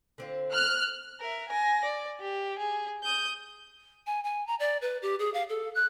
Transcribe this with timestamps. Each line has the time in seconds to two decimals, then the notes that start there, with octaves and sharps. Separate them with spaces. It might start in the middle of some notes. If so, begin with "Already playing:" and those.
0.18 D3 C4 F4
0.52 F6 F#6
1.20 A#4 E5
1.49 G#5 A#6
1.84 D5
2.20 G4
2.59 G#4
3.03 D#6 G6
4.07 G#5
4.24 G#5
4.47 A#5
4.60 D5
4.82 B4
5.02 G4
5.19 G#4
5.34 F5
5.49 A4
5.75 F#6